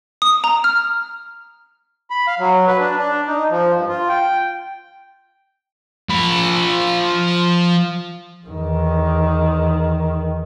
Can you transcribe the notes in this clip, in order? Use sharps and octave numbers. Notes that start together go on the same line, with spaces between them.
D#6
A#5
F6
B5
F5
F#3
B4
D4
D4
D#4
F3
G2
F4
G5
F3 B5
E2 D#3